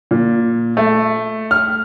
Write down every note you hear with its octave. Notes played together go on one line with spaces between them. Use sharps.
A#2
A3
F6